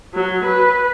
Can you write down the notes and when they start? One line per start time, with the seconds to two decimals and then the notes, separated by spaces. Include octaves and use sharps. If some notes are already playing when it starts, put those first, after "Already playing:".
0.15 F#3
0.46 B4